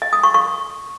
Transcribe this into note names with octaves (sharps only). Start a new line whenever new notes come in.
D#5
D#6
C#6
C#6